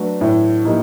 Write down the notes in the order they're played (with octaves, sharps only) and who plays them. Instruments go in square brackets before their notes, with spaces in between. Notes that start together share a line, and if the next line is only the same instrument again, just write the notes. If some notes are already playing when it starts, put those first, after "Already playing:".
Already playing: [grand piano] F#3 A3 D4 F#4 B4
[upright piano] A2
[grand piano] F3 A#3 D#4 G4